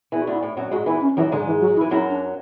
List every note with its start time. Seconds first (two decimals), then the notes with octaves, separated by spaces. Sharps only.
0.12 E2 E3 E4
0.22 F#4
0.27 D2 D3 E4
0.43 A2
0.57 F#2 F#3
0.71 G#2 G#3 F#4
0.86 E2 E3 E4
1.02 C#4
1.17 F#2 E3 F#3
1.32 G#2 D3 G#3
1.46 E3
1.61 F#3
1.76 E4
1.81 E3
1.90 F#2 F#3 E4
2.10 D4